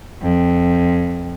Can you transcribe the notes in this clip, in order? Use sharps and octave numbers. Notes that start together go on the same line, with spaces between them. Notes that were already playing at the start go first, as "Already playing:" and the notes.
F2